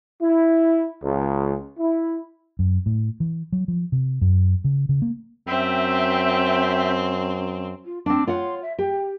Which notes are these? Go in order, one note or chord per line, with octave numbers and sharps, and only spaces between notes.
E4
C#2
E4
F#2
A2
E3
F#3
F3
C3
F#2
C#3
C#3
A#3
F#2 C4 E5 G5
F4
C4 D4 D6
F4 C#5 F#5 C6
E5
G4 G5